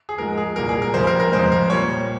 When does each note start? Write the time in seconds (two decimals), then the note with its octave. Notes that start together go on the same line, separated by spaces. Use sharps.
0.09 G#4
0.18 G#2 F3 G#3 A#4
0.38 G#4
0.56 C2 A#2 G3 A#3 A#4
0.69 G#4
0.82 A#4
0.94 F2 C#3 G3 C5
1.07 A#4
1.20 A#4
1.32 F2 C#3 F3 G#3 C5
1.52 A#4
1.70 A#2 G3 A#3 C#5